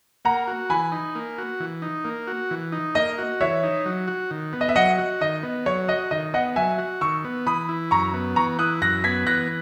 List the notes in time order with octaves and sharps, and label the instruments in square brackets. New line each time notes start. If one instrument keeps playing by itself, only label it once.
[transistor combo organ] A#3 [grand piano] F#5 A#5
[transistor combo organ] F#4
[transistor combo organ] E3 [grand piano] G#5 B5
[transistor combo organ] D#4
A#3
F#4
E3
D#4
A#3
F#4
E3
D#4
[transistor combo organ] A#3 [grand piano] D#5
[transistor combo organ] F#4
[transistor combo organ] E3 [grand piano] C#5 E5
[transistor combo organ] D#4
F#3
F#4
D#3
B3
[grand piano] D#5
E5
[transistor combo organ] F#3 [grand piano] D#5 F#5
[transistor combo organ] F#4
[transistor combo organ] D#3 [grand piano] D#5
[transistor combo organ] B3
[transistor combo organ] F#3 [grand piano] C#5
[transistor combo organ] F#4 [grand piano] D#5
[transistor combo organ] D#3 [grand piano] D#5
[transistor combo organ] B3 [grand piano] D#5 F#5
[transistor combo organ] F#3 [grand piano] E5 G#5
[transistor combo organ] F#4
[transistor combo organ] D#3 [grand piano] C#6 E6
[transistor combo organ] B3
[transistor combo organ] E3 [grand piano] B5 D#6
[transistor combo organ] E4
[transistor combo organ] F#2 [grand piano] A#5 C#6
[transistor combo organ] B3
[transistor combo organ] E3 [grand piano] A#5 C#6
[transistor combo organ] E4 [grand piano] D#6 F#6
[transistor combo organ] F#2 [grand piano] F#6 A#6
[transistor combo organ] B3 [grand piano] G#6 B6
[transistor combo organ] E3 [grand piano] F#6 A#6